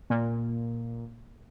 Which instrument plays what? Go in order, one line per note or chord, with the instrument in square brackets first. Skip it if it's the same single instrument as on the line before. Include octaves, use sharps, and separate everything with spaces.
[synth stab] A#2